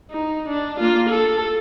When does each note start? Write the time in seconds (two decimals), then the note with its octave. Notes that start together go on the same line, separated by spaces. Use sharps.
0.11 D#4
0.49 D4
0.80 A#3 F4
1.10 A4